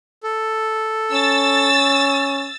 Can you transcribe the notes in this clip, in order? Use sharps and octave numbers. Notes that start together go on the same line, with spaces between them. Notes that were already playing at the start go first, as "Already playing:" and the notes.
A4
C#4 E6 A6